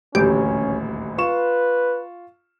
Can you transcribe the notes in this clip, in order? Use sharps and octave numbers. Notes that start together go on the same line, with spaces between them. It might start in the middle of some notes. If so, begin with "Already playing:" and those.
D#1 A1 D2 C#4 G4
F4 B4 C#6 E7